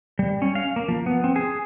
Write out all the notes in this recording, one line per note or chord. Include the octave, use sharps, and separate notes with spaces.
G3
C#4
F5
A#3
F3
B3
C4
G#4